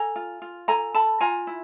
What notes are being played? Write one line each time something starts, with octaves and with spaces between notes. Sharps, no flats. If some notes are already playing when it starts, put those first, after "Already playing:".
Already playing: A4 G#5 A#5
F4
F4
A4 G#5 A#5
A4 A5 B5
F4 G#5 A#5
E4